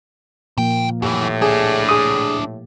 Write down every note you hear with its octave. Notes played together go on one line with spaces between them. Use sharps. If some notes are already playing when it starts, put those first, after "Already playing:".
D2 A#2 F3 A#3 G5
F#2 A2 E3 G4
D4 E4 G#4
G#4 D#6